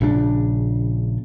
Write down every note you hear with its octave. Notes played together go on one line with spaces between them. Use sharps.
A#1 C#3 C#4 D4